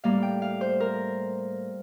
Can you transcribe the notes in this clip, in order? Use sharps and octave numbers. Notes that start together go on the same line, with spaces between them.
A2 G3 A#3 F5
G5
F5
C5
A#4